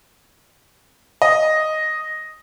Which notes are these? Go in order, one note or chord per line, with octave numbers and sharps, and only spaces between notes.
D#5